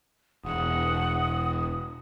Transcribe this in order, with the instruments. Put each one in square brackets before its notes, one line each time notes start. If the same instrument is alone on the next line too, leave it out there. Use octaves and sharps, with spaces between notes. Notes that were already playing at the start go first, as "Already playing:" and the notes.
[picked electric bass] E1 [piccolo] F#5 [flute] D#6